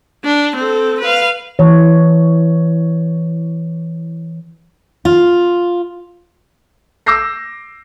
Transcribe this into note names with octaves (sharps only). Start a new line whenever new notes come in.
D4
C4 A4
B4 F5
E3 C#5
F4
D6 E6 G6 A#6 C7